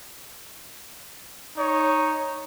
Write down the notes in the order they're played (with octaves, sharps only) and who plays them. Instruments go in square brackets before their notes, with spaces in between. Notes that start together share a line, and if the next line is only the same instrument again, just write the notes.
[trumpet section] D#4 C#5